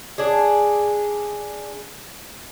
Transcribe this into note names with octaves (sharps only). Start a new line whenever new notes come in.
D4 G#4